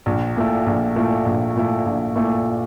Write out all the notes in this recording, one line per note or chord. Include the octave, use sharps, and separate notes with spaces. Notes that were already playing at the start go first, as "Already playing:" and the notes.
A#1
A#2 A3 E4
A#1
A#2 A3 E4
A#1
A#2 A3 E4
A#1
A#2 A3 E4